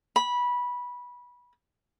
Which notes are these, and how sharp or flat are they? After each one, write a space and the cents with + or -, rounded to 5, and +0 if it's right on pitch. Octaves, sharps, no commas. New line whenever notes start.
B5 -15